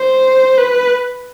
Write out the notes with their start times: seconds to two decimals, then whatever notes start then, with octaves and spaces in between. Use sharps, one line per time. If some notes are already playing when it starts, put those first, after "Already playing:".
Already playing: C5
0.58 B4